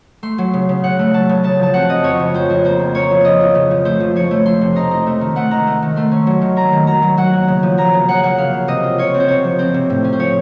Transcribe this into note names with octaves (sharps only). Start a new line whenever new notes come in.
A3 C6
F#3
C#3
C#3
C#3 F#5
A3
F#3 A5
C#3
C#3 A5
F3 A5
C4 F#5
C#3 D#5
F2 C#5
C#3
F2 C5
F2
A#3 C5
C#3
A#3 C#5
F3
C#3 D#5
F4
C#3
F3
A3 C5
F3
F3 C#5
A3
F3 C6
C3
D#4 A#5
D#4
A3
D#3
A3 F#5
D#3 A#5
A3
D#3
A3 C6
C#4
F#3
D#3
A#3 A#5
D#3
F#3 A#5
F#3
F#3 F#5
A#3
C#3
F3
A#3 A#5
C#3
C#3 F#5
A#3 F#5
C#3 F5
C#3
C3 D#5
F4
F4 C#5
C4
C5
C3 C#5
F3
C4 C5
C3
A2
C#4
C5
F3 C#5